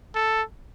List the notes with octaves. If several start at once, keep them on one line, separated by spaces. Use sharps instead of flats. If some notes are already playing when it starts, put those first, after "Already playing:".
A4